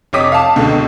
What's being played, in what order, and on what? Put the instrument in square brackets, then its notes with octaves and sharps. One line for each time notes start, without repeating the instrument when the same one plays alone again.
[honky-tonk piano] F1 C#5 D#5 D6 D#6 B6
F5 A5
C#2 B2 D3